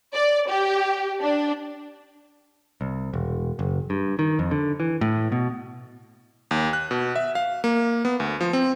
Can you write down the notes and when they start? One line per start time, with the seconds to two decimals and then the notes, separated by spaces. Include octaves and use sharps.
0.14 D5
0.50 G4
1.22 D4
2.81 C2
3.14 E1
3.59 F#1
3.90 G2
4.19 D#3
4.39 F2
4.51 D3
4.80 E3
5.01 A2
5.32 B2
6.51 D#2
6.73 F#6
6.91 B2
7.16 E5
7.35 F5
7.64 A#3
8.05 B3
8.20 D2
8.41 F3
8.53 C4